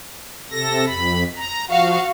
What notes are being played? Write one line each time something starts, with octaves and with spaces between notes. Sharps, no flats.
C3 A4 A#6
F2 B5
A#5
F3 F#4 F5